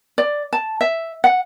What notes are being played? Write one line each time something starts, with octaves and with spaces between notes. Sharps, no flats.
D5
A5
E5
F#5